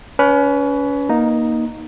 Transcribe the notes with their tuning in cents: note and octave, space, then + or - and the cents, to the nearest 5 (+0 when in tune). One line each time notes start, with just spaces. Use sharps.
C#4 +30 B4 +0
A#3 +20 D#4 +0